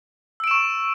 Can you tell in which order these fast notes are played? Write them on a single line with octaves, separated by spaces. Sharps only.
E6 D7 E7 C#6